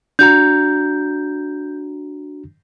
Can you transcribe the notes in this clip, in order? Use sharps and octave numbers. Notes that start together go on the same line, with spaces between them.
D4 F#4 A#5 G6